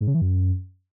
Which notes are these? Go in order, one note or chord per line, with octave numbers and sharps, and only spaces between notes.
G#2
C#3
E3
F#2